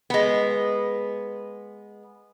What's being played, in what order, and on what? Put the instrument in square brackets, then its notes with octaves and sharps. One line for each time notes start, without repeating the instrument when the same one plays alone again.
[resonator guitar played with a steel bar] G#3 B3